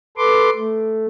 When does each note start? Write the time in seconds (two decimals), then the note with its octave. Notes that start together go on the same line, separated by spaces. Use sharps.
0.17 A4 B4 C6 D6
0.56 A3